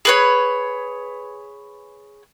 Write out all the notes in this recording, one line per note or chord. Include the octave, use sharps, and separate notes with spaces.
G#4 B4 C#5